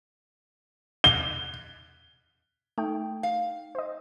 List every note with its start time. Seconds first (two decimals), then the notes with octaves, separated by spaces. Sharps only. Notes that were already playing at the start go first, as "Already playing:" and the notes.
1.04 G7
2.78 A3 D#4 G5
3.23 F5
3.75 C5 D#5